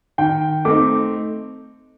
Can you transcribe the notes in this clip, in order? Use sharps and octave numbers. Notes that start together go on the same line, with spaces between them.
D#3 G5
A3 C4 D#4 D6